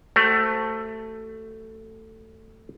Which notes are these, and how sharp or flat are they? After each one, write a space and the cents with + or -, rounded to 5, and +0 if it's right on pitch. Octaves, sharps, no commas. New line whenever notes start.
A3 +10 G4 -45 C5 +0